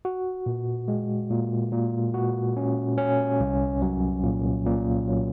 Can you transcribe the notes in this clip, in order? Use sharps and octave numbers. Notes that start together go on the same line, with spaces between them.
F#4
A#2
G#3
A#2
A#2
F#4
C#4
C#4
C2
F#3
A#2
A#2
F#3